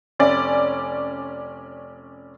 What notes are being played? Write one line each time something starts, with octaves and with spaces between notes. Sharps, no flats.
F1 C#4 D5 A6